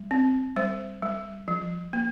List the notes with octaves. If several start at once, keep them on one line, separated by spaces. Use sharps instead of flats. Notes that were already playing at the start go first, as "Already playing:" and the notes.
Already playing: G3
C4
G3 C5
G3
F3
A#3